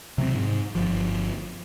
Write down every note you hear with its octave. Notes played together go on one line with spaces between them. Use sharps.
C3 F#3 A3 C4
G#2
G1 F3